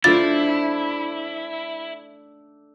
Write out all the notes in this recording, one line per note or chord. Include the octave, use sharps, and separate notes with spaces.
A3 D4 E4 F4 C5 D5 A6